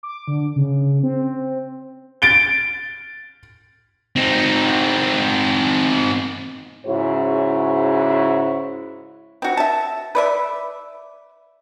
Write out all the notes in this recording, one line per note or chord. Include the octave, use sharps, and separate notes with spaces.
D6
D3
C#3
C4
A6 D7 G7
C4 D#4
G#2 C#3 E4 F#4 C#5
C4 F#4
E5 A5
B4 D5 E5